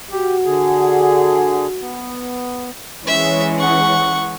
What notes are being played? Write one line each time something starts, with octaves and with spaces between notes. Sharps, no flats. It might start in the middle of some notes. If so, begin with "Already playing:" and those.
F#4 G4
D3 G#4
B3
E3 G#3 C#4 E5
F#5 C#6